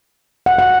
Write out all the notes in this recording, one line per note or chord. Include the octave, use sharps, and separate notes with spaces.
F#5
F#5